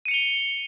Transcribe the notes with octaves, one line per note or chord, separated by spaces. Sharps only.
C#7 D#7 F7 G7